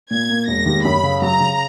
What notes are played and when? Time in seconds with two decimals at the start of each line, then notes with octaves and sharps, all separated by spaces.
0.11 A#2 G#6
0.29 A#3
0.48 E1 A#6
0.66 D#2
0.84 F#2 B5
1.03 C#3
1.22 F#3 A#5
1.40 C#3